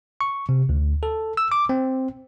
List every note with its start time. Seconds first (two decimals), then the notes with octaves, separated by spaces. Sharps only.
0.21 C#6
0.49 C3
0.69 D2
1.03 A4
1.37 E6
1.52 D6
1.69 C4